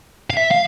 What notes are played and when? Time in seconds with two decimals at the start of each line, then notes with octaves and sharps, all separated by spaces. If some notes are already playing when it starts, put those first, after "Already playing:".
0.30 F5
0.37 E5
0.51 F5